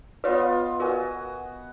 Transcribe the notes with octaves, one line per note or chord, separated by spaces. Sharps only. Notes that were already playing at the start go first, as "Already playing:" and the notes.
B3 F4 B4 C#5 D#5
F#4 A#4 B4 G#5